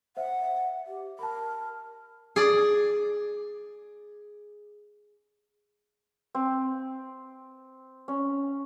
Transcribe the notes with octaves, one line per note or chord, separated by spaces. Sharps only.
C5 E5 F#5
G4
A#4 A5 B5
G#4 D5
C4
C#4